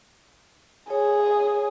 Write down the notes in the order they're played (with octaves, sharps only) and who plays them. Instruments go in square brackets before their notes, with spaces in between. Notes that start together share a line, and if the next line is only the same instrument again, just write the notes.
[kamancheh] G#4 [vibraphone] C#5